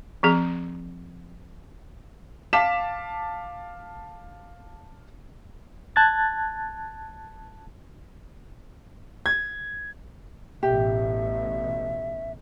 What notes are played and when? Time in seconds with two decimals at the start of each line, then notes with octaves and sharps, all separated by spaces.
0.23 F3 C4 G#4
2.53 F5 A5 D6 B6 E7
5.96 A5 F#6 G#6 A6
9.26 G#6
10.63 A1 B2 G4 E5